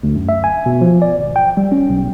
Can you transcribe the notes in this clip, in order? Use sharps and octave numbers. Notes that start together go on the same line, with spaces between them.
D2
F#2
E5
G#5
B2
F3
D5
G#1
G5
G3
C#4
B1